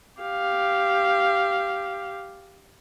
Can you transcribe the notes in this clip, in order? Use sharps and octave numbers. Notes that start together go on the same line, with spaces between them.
G4 F5